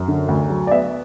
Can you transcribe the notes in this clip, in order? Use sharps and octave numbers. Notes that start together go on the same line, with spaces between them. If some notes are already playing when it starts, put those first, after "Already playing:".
Already playing: F#2
D3
D2
F#3
D5
B3 E5